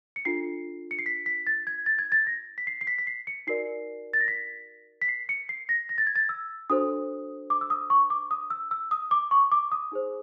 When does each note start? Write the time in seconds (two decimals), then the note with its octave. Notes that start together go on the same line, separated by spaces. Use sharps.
0.16 C#7
0.25 D4 F4 A4 C7
0.91 C#7
0.99 C7
1.06 B6
1.26 B6
1.47 A6
1.67 G#6
1.86 A6
1.99 G#6
2.12 A6
2.27 A#6
2.58 B6
2.67 C7
2.81 C7
2.87 B6
2.98 B6
3.07 C7
3.27 C#7
3.47 D#4 F#4 A#4 D5 C7
4.13 A6
4.21 A#6
4.28 B6
5.02 B6
5.08 C7
5.29 C#7
5.49 C7
5.69 A#6
5.89 A#6
5.98 A6
6.07 G#6
6.16 A6
6.29 E6
6.70 D4 F#4 A4 C5 D#6
7.50 D6
7.61 E6
7.70 D#6
7.90 C#6
8.10 D6
8.31 D#6
8.50 E6
8.71 E6
8.91 D#6
9.11 D6
9.31 C#6
9.52 D6
9.72 D#6
9.92 D#4 G#4 C5